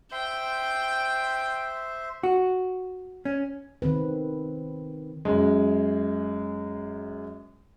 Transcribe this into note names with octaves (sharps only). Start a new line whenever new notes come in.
C5 E5 G5 C6
F#4
C#4
D#3 C4 B4
F#2 G#3